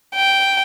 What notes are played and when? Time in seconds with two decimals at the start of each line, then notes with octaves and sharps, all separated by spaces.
0.15 G5